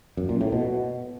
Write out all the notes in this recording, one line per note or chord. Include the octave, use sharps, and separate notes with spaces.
F#2
A#2
A2
B2